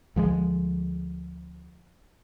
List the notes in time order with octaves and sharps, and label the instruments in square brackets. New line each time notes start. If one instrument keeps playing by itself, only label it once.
[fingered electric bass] D2 F3 F#3 G#3